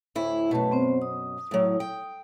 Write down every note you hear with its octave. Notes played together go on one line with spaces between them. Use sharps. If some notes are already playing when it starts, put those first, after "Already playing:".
D2 A2 E4
F#2 B2 A3 B4 A5
B3 C4 C5
D#6
A2 F#3
G5